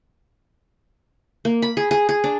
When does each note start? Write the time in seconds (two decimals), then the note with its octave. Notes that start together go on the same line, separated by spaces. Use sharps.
1.45 A#3
1.62 B5
1.77 G#4
1.91 G#4
2.09 G#4
2.24 D4